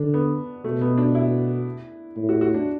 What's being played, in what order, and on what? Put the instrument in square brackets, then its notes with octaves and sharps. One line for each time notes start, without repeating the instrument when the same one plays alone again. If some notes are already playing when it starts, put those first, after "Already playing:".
Already playing: [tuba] D3 [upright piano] D4
[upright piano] B3
[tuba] B2 [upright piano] A3
[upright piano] B3
D4
E4
[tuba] A2
[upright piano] F#4
F#4
D4